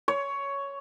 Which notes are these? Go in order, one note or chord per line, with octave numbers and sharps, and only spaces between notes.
C#5